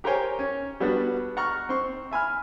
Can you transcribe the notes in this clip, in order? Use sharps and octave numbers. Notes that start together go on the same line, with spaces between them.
G4 A#4 C5 C#5 G5 G#5
C#4
G3 B3 D4 F#4
F#5 A#5 C#6 F6
C4 C6 C#6
E5 G#5 B5 F6